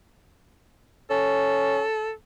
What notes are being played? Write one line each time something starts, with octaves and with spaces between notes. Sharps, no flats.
C#4 A4